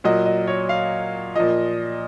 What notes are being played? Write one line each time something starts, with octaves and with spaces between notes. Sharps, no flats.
A#2 F#3 D#5
D#5
C#5
F5
A#2 F3 D#5